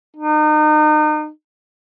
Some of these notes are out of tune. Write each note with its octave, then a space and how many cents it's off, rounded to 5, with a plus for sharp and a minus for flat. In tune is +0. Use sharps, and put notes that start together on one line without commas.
D#4 -35